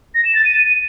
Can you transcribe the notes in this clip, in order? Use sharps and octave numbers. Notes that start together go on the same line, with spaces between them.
A#6
E7
A6
D#7